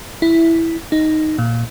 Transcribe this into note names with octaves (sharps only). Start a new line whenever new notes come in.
E4
D#4
A#2